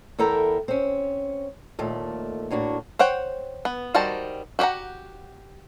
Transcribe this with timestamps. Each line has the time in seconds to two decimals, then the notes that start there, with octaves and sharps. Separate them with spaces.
0.19 E2 E4 A4 A#4 G5 A#5
0.68 C4 C#4
1.79 D#2 A#2 A3
2.50 A2 A#3 D4 F#4
2.99 C5 C#5 F#5 G5
3.65 B3
3.94 D#3 G3 F#4 C5 A5
4.59 F#4 G4 C5 F#5 A#5